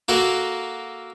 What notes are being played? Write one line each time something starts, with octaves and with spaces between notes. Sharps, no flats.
A#3 F#4 A4 A#4